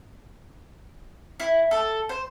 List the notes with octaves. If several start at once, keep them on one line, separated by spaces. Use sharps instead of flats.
E4
A4
C5